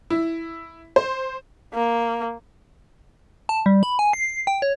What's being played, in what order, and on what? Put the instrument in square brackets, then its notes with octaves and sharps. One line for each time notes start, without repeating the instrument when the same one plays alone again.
[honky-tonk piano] E4
C5
[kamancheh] A#3
[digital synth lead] A5
G3
B5
G#5
C7
G5
C#5